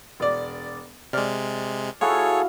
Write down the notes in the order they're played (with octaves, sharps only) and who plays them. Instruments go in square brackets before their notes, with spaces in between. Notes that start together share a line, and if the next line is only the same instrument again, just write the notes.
[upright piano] E1 D5
[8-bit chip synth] C3 G#3 [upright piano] D5 F6
[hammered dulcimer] E4 F#4 F5 [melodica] G#4 A4 [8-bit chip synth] C#5